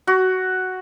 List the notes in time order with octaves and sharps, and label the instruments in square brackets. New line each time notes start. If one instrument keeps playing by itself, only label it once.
[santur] F#4